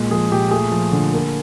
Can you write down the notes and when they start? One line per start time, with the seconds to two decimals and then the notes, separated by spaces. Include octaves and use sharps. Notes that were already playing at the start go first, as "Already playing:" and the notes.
Already playing: A#2 G#3
0.11 F3 G#4
0.31 A#2 G4
0.51 A3 G#4
0.71 F3
0.92 D3
1.13 A#3